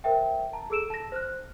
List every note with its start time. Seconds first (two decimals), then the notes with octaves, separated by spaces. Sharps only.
0.04 A#4 C5 E5 G5
0.53 A5 A#5
0.70 G#4 A4 E6 D7 E7
0.90 A5 A#6
1.12 C5 F6 F#6